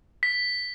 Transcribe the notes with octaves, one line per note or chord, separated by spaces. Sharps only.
B6